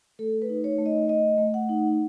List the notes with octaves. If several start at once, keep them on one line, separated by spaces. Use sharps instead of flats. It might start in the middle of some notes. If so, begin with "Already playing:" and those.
A3 A4
B4
D#4
C#5
A3
D#5
A3 D#5
A3
F#5
D#4